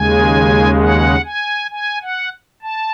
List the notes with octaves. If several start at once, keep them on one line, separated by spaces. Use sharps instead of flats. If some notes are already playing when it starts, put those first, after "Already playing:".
Already playing: D#2 C#3 G#3 G#5
F#5
G#5
G#5
F#5
A5